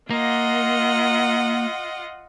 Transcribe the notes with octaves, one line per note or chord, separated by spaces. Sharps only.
A#3 F4 D#5 F#5